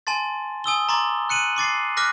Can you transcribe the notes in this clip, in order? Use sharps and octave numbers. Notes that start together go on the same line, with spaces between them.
G#5 A5 C6 A6
G#5 D#6 E6 G7
A#5 C6 D6 A6
F#6 C#7 D#7 F#7
C6 D6 A6 C7
D6 F6 F#6 A#6 B6